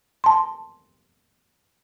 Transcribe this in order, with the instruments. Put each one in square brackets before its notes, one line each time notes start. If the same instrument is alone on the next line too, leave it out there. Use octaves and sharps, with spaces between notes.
[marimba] A5 C6